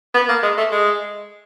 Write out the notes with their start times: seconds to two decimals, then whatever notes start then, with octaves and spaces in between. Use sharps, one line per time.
0.14 B3
0.29 A#3
0.43 G#3
0.57 A3
0.72 G#3